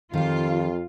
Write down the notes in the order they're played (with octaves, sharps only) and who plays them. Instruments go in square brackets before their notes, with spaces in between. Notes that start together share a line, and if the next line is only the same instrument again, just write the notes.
[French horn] F2 [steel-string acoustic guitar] D#3 G4 [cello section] F4